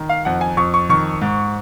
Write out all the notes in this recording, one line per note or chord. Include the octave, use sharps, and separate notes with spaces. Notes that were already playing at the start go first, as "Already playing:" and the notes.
Already playing: D#3
F5
F2 F#5
G#5
F2 C#6
C#6
D#3 C#6
G#2